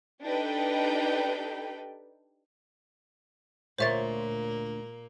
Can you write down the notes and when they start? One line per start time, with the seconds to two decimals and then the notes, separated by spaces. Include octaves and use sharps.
0.22 D4 D#4 G4 A4 B4 G5
3.79 D2 A#2 A#3 F4 C5 C#5 E5 A6